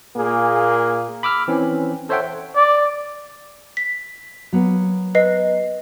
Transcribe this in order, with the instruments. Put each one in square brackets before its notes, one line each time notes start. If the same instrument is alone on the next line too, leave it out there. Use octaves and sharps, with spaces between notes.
[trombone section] A#2 A#3 G#4
[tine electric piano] B5 D6 E6 F6
E3 C4 C#4
A4 C5 C#5 E5 F#5 G5
[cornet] D5
[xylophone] B6
[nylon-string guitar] F#3 A#3 B3
[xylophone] B4 D#5 C7